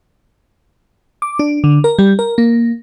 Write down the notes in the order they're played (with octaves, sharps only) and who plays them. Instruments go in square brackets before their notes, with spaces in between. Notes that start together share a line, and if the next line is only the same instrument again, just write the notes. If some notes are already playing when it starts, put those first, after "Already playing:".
[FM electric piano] D6
D4
D3
A#4
G3
A#4
A#3